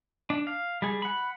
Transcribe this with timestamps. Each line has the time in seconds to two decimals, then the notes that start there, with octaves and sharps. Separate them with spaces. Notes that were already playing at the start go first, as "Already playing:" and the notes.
0.30 D4
0.47 F5
0.82 G3 G#4
1.02 F#5 B5